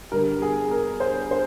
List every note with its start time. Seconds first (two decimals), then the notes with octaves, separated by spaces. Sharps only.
0.11 G2 D3 G3 A#4
0.42 G#4
0.71 A#4
1.00 C5
1.31 C5